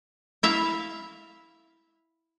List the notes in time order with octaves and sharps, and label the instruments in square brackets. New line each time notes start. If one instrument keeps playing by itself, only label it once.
[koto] E4 E5 F5